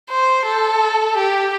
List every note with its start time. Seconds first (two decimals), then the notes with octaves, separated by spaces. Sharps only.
0.10 C5
0.46 A4
1.17 G4